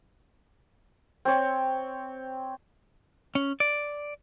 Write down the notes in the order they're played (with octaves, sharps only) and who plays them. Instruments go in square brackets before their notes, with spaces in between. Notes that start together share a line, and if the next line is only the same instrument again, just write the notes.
[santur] C4 C#5
[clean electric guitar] C#4
D5